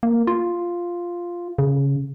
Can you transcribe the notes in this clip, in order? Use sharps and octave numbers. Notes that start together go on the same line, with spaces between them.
A#3
F4
C#3